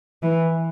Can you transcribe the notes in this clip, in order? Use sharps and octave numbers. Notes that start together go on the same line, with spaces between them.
E3